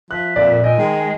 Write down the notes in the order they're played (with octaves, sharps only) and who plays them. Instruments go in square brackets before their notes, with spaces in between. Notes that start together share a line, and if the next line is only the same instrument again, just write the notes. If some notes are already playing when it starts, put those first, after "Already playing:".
[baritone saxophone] F3 [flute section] E5 [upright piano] F#6
[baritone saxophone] F2 [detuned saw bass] A#2 [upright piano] D5
[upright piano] D#5 [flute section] G5 G#5 E6
[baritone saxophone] D#3 [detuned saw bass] G#3 [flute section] G#4